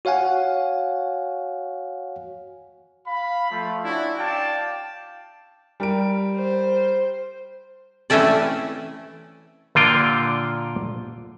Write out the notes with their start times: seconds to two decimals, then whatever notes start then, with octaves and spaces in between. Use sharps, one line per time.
0.05 F#4 C#5 F5 F#5 G#5
3.07 F5 B5
3.51 F3 A3
3.84 C#4 D4 E4 F#4
4.19 D5 F5 G5 A5
5.80 G3 A#4 D7
6.35 C5
8.10 E3 A3 C4 C#4 A4 D5
9.75 A#2 D3 F4 G5